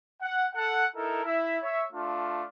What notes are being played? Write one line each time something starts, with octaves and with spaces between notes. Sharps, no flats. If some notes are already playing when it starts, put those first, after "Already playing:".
F#5
A4 F#5
D#4 E4 A4 A#4
E4 E5
C#5 E5
A3 D4 F4